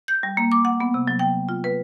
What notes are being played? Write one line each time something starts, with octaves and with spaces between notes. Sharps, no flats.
G6
G3
A#3
D6
F#5
B3
C3
F#3
G5
F4
B4